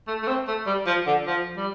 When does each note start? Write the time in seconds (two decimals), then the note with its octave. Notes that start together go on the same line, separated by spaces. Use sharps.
0.08 A3
0.23 A3
0.27 C4
0.47 A3
0.66 G3
0.87 F3
1.07 D3
1.27 F3
1.57 G3